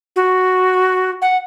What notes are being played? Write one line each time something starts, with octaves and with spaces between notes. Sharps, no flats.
F#4
F#5